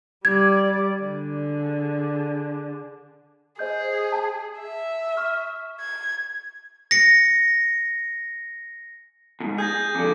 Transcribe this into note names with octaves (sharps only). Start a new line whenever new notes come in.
G3 D5 G#6
D3 G#4
G#4 C5 D#5 G6
A5
E5
C#6 F6
G#6
A#6 C#7
E2 G#2
G#4 G6 G#6 A#6
F2 D3 D6